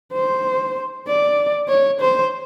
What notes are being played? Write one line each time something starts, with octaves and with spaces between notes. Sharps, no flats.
C5
D5
C#5
C5